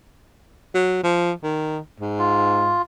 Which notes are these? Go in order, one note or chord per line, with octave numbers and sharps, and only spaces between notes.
F#3
F3
D#3
G#2
F4